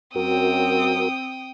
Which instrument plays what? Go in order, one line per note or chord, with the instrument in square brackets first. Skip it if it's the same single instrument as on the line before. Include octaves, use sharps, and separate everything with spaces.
[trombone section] F#2 [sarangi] C4 [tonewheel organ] F#4 A#4 [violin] G5 D#6